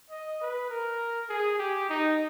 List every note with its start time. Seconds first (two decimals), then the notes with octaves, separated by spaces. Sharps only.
0.11 D#5
0.41 B4
0.70 A#4
1.29 G#4
1.59 G4
1.89 D#4